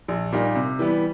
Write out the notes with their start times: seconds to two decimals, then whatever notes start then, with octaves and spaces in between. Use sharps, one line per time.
0.08 A#1
0.32 A#2 G3 A#3 D#4
0.55 C3
0.79 E3 G3 B3